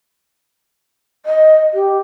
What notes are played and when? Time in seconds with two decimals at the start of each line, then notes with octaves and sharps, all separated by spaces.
1.26 D#5
1.74 G4